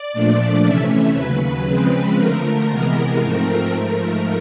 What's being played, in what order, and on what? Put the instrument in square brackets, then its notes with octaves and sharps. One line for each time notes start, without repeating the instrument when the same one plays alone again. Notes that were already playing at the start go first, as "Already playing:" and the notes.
Already playing: [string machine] D5
A#2 F3 A3 D4
C3 E3 A3 C#4 E5
D#2 C#3 F#3 B4
C#3 F3 G#3 C4
D3 F3 A3 A#4
C3 E3 G#3 B3 A#4
G#2 F3 A3 C4
G#2 F3 A3 A#4